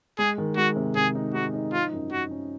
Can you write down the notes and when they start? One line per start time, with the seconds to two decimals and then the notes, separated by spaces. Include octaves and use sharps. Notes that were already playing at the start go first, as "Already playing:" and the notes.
0.19 G#3 G#4
0.38 D#3
0.57 G#3 F#4
0.76 C3
0.96 C3 G#4
1.15 D#4
1.34 G#3 F#4
1.54 D#4
1.73 F3 F4
1.93 F#2
2.11 F#2 F#4
2.31 C#4